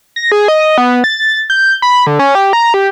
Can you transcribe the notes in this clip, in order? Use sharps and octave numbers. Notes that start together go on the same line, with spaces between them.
A#6
G#4
D#5
B3
A6
G6
B5
D3
C#4
G4
A#5
G4